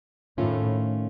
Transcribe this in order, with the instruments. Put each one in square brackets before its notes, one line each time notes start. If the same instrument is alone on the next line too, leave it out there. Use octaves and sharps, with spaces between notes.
[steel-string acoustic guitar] F2 D#3 A3 C#4 F4 [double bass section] A2